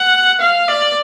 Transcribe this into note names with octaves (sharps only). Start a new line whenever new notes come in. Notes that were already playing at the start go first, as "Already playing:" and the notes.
Already playing: F#5
F5
D5